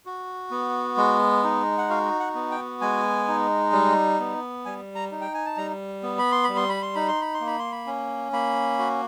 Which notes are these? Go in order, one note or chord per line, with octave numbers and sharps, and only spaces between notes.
F#4
B3
G#3
D#4
F#5
F#4 F5
F#5
B3
G5
G#3 G#5
D#4
G3
B3
G3 G#5
A#5
D#4
G5
G#5
A5
G3 A#5
B3
B5
C6
G3 B5
C6
B5
C6
D#4 B5
C6
B5
C6
A#3
B5
C6
B5
C#4
A#3 B5
F#4